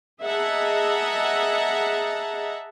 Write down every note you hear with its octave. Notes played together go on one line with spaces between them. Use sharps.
G#4 D#5 E5 F#5 A5 A#5